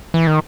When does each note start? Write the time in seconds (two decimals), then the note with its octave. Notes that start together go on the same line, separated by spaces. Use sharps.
0.14 E3
0.27 D#3